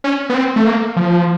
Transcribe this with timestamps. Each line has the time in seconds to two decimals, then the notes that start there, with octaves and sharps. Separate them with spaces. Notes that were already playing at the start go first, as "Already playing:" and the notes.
0.04 C#4
0.30 B3
0.34 C4
0.56 A3
0.66 A#3
0.97 F3